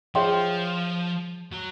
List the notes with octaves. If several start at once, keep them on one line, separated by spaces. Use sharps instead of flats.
F3 G#4 C#5 E5 G5 C6
F#3